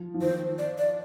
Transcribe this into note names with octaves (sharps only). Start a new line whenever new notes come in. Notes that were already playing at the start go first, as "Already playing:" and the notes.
Already playing: F3
F3
D#3 C5
D5
D5